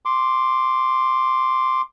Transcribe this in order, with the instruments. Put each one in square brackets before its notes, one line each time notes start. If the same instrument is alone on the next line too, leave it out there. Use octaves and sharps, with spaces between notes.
[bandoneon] C6 D6